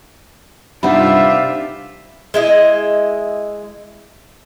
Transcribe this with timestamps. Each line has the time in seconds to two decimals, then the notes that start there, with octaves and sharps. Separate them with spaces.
0.83 G2 C3 D4 D#4 F4 E5 F#5 B5
2.34 G#3 E4 D#5